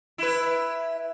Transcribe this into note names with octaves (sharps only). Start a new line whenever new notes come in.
E4 B4